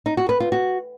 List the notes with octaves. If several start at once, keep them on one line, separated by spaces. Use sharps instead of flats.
D#4
F#4
B4
F4
F#4